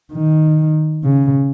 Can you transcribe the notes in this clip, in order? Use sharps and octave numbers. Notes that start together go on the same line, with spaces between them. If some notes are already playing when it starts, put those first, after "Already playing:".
D#3
C#3